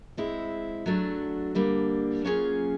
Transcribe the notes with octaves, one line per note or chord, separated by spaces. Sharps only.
G#3 C4 E4
F#3 A3 D4 F#4
D3 G3 A#3 D4
F#3 A#3 C#4 F4 G#4